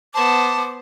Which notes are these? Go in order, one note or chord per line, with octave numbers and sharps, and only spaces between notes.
B3 C5 A5 D6